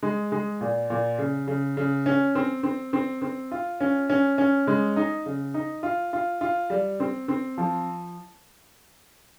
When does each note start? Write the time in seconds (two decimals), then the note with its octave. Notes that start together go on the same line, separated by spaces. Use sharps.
0.03 G#3
0.32 G#3
0.61 A#2
0.90 A#2
1.18 C#3
1.47 C#3
1.77 C#3
2.06 C#4
2.35 C4
2.63 C4
2.93 C4
3.22 C4
3.51 F4
3.80 C#4
4.10 C#4
4.38 C#4
4.67 G#3
4.96 D#4
5.26 C#3
5.54 D#4
5.83 F4
6.13 F4
6.41 F4
6.70 G3
7.00 C4
7.28 C4
7.58 F3